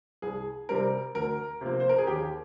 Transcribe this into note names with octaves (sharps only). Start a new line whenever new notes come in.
C2 G#4
C3 G3 C4 A#4
D2 A#4
C3 F3 A#3
C5
A#4
G#4
D#2 G4